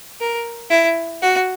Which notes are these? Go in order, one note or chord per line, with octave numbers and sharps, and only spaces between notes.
A#4
E4
F#4